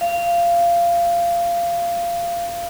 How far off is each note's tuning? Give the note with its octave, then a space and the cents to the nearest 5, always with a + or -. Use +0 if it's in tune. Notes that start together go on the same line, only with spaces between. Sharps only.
F5 -20